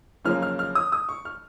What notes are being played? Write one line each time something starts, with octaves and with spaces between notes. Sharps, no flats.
F#2 C#3 F3 A#3 C#4 F6
F6
F6
D#6
D#6
C#6
F6